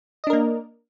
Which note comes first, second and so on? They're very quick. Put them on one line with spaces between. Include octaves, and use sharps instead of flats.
D#5 D4 A#4 A#3